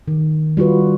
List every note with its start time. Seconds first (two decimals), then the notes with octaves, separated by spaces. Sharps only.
0.08 D#3
0.57 G3 F4 F#4 B4